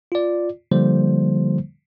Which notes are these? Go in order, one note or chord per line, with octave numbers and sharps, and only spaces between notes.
F4 D5
D3 F3 G3 A#3 C5